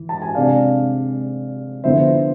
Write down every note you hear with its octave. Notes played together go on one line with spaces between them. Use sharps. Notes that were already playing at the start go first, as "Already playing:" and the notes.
Already playing: E3
A5
G#5
C3 G#3 D4 D5 F5
D3 F3 B3 E4 C5 E5